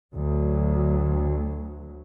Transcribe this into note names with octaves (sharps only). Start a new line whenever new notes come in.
D2 F#3